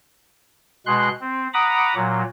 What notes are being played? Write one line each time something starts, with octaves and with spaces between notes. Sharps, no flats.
B2 G#3 C6 F#6
C4
F#5 A#5 B5 D6 D#6
A#2 F#3